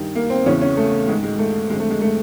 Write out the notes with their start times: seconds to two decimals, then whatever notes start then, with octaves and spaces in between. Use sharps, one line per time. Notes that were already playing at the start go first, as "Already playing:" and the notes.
Already playing: G2 D#3
0.15 A#3
0.30 C4
0.46 E2 C#3 E3 C#4
0.62 C#4
0.77 A3
1.08 G#2 D#3 G#3
1.23 G#3
1.39 A3
1.70 D3 G#3
1.73 F2
1.80 A3
1.90 G#3
2.01 A3